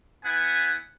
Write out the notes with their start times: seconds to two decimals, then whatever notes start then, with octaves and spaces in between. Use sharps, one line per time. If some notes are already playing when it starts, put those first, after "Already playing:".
0.24 B3 E4 F#5 G#5